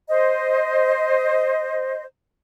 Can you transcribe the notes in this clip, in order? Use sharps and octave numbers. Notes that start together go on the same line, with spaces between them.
C5 D#5